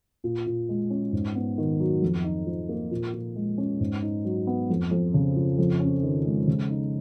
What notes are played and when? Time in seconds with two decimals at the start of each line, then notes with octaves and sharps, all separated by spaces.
0.24 A#2
0.46 A#2
0.69 G#3
0.90 C#4
1.13 G#2
1.35 B3
1.58 D#3
1.80 F#3
2.02 F2
2.24 D#4
2.47 F3
2.69 A#3
2.91 A#2
3.14 A#2
3.36 G#3
3.58 C#4
3.80 G#2
4.02 D#4
4.25 F#3
4.47 B3
4.70 F2
4.91 F2
5.14 C#3
5.36 F3
5.58 F2
5.80 C#4
6.03 D#3
6.25 G#3
6.48 C#3
6.70 D#4